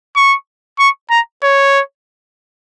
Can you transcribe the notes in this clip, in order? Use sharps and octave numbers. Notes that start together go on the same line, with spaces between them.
C#6
C#6
A#5
C#5